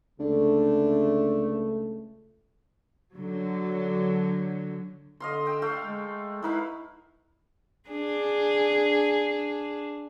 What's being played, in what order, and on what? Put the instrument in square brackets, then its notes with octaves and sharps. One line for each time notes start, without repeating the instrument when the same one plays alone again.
[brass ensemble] C#2 A3 [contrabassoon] D3
[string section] D3 F#3
[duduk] D3 [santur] D#5 F5 C6
[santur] G5 E6
A3 F5
[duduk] G#3
[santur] D#4 B4 F5 [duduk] E4
[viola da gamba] D4 G#4